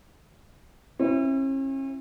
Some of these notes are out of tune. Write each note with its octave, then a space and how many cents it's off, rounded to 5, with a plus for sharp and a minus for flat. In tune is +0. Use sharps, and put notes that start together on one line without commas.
C#4 -45 E4 +0